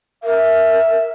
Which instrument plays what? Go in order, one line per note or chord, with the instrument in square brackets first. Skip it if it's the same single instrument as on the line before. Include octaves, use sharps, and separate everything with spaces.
[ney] A#4 [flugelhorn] E5